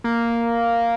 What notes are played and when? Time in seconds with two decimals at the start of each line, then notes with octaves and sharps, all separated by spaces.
0.04 A#3